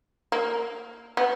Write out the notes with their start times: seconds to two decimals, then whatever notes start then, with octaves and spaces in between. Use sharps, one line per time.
0.32 A#3
1.17 B3